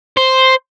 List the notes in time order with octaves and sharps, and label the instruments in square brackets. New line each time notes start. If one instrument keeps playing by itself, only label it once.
[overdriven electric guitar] C5